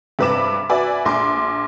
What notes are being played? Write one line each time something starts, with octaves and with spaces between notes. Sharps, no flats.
G2 C3 B4 B5 D6 E7
F#4 B4 D5 E5 G#5
A#1 C6 D6